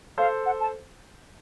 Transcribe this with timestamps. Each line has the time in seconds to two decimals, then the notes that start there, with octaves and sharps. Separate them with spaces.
0.18 A4 C5 F5
0.46 F#5
0.60 A5